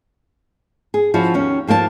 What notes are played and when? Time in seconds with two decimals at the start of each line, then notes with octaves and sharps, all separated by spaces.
0.94 G#4
1.14 F3 C#4 E4 F#4
1.34 D#2 C#4
1.67 D#2 F3 A#3 C5 A5